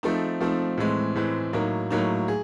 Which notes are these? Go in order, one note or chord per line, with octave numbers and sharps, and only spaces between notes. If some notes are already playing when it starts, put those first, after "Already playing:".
F3 A3 C4 D#4
F3 A3 C4 D#4
A2 E3 G#3 C4
A2 E3 G#3 C4
A2 F#3 A#3 D#4
A2 F#3 A#3 D#4
G#4